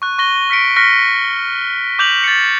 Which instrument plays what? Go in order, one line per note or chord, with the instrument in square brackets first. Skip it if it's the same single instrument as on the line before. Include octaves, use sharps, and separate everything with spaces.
[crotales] C#6 F#6
C#6 A#6 G7
F6 B6 C#7 D7
C#6 F6 F#6 A#6 B6 C#7
D6 G6 F7 F#7
A6 C#7